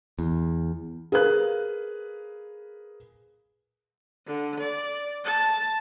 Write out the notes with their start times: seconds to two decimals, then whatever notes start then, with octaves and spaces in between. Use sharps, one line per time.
0.19 E2
1.12 G#4 A#4 B4 F5 F#6
4.27 D3
4.59 D5
5.24 A5